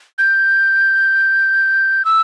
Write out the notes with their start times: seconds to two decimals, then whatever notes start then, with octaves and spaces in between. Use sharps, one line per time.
0.18 G6
2.05 E6